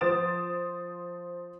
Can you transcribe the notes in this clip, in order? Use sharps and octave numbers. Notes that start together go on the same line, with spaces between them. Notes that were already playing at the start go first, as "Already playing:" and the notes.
F3 C5 D#6 A6 D7 E7